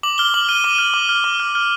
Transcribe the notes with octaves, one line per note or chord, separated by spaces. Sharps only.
D6 F#7
F6 G7
D6 F#7
F6 D#7
D6 D#7
F6
D6
F6
D6
F6
F6